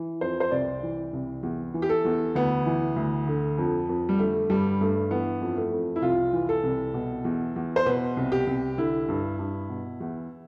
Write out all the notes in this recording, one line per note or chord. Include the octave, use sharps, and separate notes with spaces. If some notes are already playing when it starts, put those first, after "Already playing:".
Already playing: E3
F2 C5
C5
C2 D5
E3
C2
E2
E3
G4
A4
E2
D2 B3
E3
D2
D3
F2
F2
G3
D3 A3
G2 G3
G2 A3
E3 B3
F2
A3
F2
E4
C2 F4
E3
A4
C2
B2
E2
E2
C5
B2 B4
C2
G4
C2
D3 E4
G2
G2
B2
E2